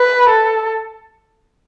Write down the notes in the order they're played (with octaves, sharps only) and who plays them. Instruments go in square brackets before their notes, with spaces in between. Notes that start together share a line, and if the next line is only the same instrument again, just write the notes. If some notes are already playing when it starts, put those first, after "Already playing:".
Already playing: [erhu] B4
A4